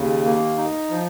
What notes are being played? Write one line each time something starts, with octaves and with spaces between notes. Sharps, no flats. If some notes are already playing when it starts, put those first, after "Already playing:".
Already playing: D#2 C#3
A#3
D#4
F3